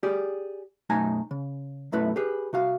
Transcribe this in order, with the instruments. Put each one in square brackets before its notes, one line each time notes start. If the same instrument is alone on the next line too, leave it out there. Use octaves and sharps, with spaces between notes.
[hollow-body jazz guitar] G4 G#4 D5
F#2 B2 A3 D#4 G#5 A#5
C#3
B1 F#2 A3 E4 B4
G4 G#4 B4
C3 F#4 F5